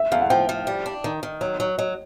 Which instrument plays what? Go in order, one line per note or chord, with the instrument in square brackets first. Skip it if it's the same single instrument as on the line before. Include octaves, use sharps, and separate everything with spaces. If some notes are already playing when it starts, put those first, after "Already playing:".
Already playing: [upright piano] E5
[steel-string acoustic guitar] E2 [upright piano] F5
[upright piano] F#5
[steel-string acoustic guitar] F3 [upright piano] G5
[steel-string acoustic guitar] F3
G3
D4
D#3
D#3
F#3
F#3
[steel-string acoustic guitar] F#3 [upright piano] D#5